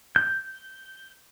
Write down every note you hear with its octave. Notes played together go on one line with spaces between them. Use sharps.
G6